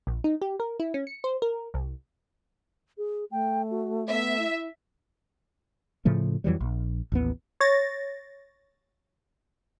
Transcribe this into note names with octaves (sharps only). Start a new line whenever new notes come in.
A#1
D#4
G4
A#4
E4
C#4
C#7
C5
A#4
C2
G#4
A3 G5
F#4
B3 E5
E4
A2 C#3 F3 A3
F2 E3 F#3 G3
A#1
A1 D#2 B3
C#5 A6 A#6